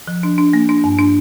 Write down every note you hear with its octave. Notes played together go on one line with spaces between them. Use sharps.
F3
D4
D4
A#3
D4
G2
D4